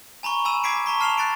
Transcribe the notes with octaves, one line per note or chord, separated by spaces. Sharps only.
G#5 A#5 B5 C#6
G#5 B5 E6 D#7 E7
G#5 D6 G#6 B6 C7 D7
A5 A#5 C#6 B6
A5 F6 C7 E7 F7 G7
F#6 A6 C7 D7